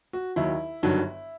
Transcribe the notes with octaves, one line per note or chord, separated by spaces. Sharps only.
F#4
D#2 D#3 F#3 E4
G1 G2 D#3 F#3